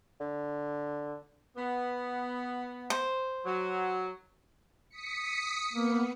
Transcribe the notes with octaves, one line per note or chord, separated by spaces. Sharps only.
D3
B3
C5
F#3
D#6 B6 C#7
A#3 B3